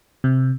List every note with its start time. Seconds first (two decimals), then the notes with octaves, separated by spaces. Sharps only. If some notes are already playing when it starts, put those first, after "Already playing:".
0.24 C3